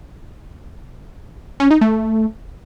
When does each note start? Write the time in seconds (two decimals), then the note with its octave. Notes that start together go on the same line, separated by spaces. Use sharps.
1.60 C#4
1.71 D#4
1.81 A3